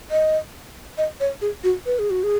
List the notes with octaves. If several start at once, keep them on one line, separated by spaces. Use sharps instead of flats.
D#5
D#5
C#5
G#4
F#4
B4
G#4
F#4
G#4